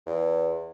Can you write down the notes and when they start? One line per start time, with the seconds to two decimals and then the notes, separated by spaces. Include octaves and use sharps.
0.06 E2